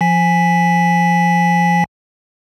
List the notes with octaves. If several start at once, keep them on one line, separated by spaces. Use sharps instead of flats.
F3 G#5 B6